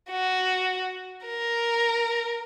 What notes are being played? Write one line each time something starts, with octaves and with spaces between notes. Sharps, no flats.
F#4
A#4